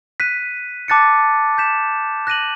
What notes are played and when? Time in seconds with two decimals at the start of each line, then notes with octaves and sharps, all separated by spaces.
0.20 F#6 B6 D#7
0.88 A5 D6 F#6 A6 C#7
1.58 G6 B6 E7
2.27 F#6 A#6 D#7 F#7